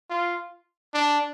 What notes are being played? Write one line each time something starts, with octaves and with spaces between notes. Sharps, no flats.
F4
D4